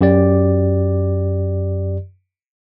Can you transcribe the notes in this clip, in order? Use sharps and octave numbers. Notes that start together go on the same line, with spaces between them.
F#2 G4 D5